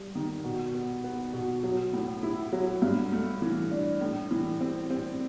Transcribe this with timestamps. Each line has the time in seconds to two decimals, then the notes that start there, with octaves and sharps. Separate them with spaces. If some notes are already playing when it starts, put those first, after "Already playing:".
Already playing: G3
0.15 D#3
0.44 B2
0.74 B3
1.04 B3
1.33 B2
1.63 F#3
1.93 A2
2.23 E4
2.52 F#3
2.82 G2
3.12 A3
3.42 E3
3.71 D4
4.01 A2
4.31 E3
4.60 C4
4.90 C4